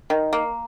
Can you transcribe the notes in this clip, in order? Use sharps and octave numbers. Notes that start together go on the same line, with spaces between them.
D#3
A#3